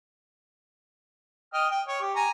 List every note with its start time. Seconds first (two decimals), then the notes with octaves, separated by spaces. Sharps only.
1.54 D#5 G5 F6
1.71 G5
1.88 C#5
2.01 G4
2.16 G#5 A#5